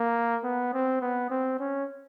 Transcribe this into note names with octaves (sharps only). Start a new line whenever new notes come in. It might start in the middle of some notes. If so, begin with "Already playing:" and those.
Already playing: A#3
B3
C4
B3
C4
C#4